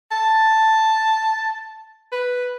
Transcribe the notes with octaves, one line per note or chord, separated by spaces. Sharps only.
A5
B4